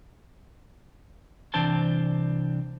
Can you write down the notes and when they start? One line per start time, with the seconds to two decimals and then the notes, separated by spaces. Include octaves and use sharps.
1.54 C2 E3 C4 D4 C5 A5